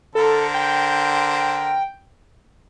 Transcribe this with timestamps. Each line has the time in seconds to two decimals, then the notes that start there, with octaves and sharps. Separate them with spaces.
0.15 D3 A4 A#4 C5
0.54 G5